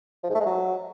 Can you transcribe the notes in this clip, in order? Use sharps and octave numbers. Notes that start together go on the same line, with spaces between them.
F3
G#2
A3
G#3
F#3